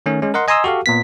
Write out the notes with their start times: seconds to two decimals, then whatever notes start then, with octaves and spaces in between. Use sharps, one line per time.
0.06 D#3 A3 C#4
0.22 G#3 C#4
0.34 A#4 D#5 F#5 C6
0.48 D#5 G#5 A#5 C6 D#6 E6
0.64 F#4 G4 A4 F5
0.86 A#2 B3 B6